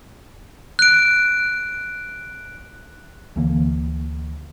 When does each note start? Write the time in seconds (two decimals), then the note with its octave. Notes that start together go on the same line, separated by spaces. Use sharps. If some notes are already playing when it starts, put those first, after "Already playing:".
0.79 F#6 D7
3.36 D2 D3 E3 A#3